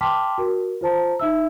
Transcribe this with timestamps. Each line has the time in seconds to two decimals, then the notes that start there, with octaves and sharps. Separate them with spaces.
0.01 G5 A5 C6 D6 F6 B6
0.38 F#4 A#4
0.81 F4 C5 A5 A#5
1.20 D#4 E5 E6